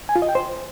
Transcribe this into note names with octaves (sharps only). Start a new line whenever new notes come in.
G#5
F4
D#5
G5
C5